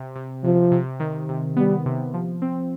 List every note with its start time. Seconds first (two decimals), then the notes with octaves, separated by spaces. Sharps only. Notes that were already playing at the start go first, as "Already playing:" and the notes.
Already playing: C3
0.15 C3
0.44 C3 F3
0.71 C3
1.00 D#3
1.29 C3
1.56 G3 B3
1.86 C3
2.14 F3
2.42 C4